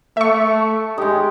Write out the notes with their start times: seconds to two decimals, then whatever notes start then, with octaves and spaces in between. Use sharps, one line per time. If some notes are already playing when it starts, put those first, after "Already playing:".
0.17 A3 E5 C#6
0.98 G#3 D#4 G4